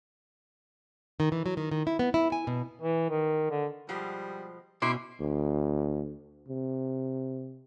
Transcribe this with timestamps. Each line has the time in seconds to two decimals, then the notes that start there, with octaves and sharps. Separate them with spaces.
1.20 D#3
1.32 E3
1.46 F#3
1.57 D#3
1.71 D#3
1.87 E4
1.99 B3
2.14 E4
2.32 G#5
2.47 B2
2.82 E3
3.10 D#3
3.51 D3
3.89 B2 F3 G3 G#3
4.82 B2 C#4 E4 C6 D6
5.20 D2
6.48 C3